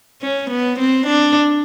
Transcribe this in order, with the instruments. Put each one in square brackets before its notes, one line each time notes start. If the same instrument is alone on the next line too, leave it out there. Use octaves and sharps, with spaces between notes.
[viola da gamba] C#4
B3
C4
D4